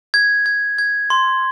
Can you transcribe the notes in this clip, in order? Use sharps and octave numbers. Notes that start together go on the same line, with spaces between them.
G#6
G#6
G#6
C6